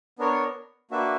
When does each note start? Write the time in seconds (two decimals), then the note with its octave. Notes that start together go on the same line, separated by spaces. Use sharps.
0.19 B3 D4 A#4 C#5
0.91 A#3 D4 F#4 B4 E5